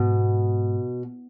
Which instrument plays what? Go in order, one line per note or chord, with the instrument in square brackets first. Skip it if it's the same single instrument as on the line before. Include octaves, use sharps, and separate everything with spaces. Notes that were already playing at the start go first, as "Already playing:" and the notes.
Already playing: [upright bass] G#2 [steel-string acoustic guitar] B2